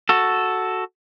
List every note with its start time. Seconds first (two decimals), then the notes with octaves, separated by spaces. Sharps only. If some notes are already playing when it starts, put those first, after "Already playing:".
0.09 F#4 A4